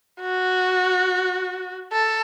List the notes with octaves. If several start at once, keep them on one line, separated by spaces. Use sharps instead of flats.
F#4
A4